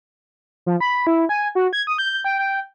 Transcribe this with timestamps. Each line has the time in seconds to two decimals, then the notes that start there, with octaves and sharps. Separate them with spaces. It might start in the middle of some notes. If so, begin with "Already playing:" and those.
0.66 F3
0.80 B5
1.07 E4
1.29 G#5
1.55 F#4
1.73 G#6
1.87 D#6
1.98 G6
2.24 G5
2.39 G5